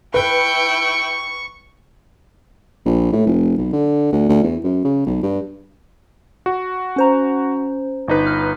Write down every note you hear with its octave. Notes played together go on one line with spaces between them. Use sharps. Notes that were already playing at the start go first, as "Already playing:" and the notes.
E4 B4 G5 C#6
A#1
A2
F1
B1
D3
D2
D2
E2
F#2
C#3
B1
G2
F#4
C#4 C5 A#5
G1 D#4 B4
F6